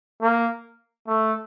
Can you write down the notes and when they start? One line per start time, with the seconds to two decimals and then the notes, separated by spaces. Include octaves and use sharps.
0.22 A#3
1.07 A3